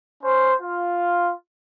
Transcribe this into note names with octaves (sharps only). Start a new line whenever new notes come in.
C#4 C5
F4